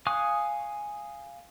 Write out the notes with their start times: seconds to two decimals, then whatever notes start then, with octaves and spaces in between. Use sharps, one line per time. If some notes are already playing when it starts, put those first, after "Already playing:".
0.07 F5 G#5 C#6 D#6 F#6